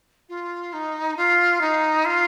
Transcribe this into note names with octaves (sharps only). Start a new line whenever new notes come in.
F4
D#4
F4
D#4
F4